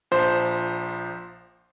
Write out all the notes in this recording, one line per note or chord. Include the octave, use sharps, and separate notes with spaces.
A#1 F3 C5